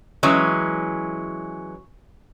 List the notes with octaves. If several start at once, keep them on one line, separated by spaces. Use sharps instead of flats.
E3 F#3 G#3 C#4